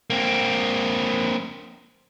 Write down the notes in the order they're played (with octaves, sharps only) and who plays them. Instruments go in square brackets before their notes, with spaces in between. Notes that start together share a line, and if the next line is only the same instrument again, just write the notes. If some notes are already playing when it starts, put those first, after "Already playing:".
[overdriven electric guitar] A#3 C4